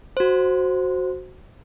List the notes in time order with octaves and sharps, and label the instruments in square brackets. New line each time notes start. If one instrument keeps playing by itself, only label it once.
[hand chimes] F#4 C5